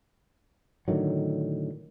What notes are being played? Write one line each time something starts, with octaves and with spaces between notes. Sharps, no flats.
A2 D3 D#3 F#3